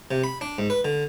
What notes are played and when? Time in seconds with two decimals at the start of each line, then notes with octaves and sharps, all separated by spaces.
0.11 C3
0.24 B5
0.41 D4
0.58 G#2
0.70 B4
0.85 D3